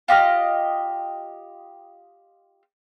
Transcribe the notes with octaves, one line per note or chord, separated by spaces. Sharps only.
F4 G4 D#5 F6